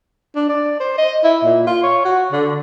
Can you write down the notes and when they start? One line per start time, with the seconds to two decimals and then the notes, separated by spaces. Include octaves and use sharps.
0.36 D4
0.49 D5
0.80 C5
0.98 D#5
1.24 E4
1.44 A#2
1.67 F4
1.83 C#5
2.05 F#4
2.32 D3